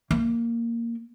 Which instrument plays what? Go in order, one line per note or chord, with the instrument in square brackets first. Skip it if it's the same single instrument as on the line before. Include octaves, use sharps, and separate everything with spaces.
[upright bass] A#3